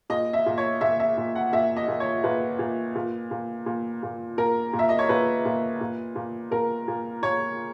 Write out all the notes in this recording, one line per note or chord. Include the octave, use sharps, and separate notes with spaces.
A#2 D#5
E5
A#2
C#5
A#2 E5
E5
A#2
F#5
A#2 E5
D#5
A#2
C#5
A#2 B4
A#2
A#2
A#2
A#2
A#2
A#2 A#4
A#2
E5
D#5
C#5
A#2 B4
A#2
A#2
A#2
A#2 A#4
A#2
A#2 C#5